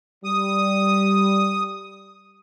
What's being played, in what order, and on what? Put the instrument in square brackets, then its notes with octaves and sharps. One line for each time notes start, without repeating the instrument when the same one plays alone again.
[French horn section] G3 [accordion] D#6